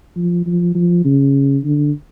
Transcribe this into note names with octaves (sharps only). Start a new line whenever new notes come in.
F3
F3
F3
C#3
D3